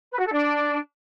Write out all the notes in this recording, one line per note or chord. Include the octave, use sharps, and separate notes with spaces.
B4
F#4
A4
D4